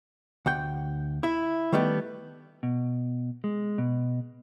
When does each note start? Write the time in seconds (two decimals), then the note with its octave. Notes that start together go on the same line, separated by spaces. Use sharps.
0.46 D2 F#5 G5
1.23 E4 E5
1.72 D#3 G3 A3 B3 G4
2.63 B2
3.44 G#3
3.78 B2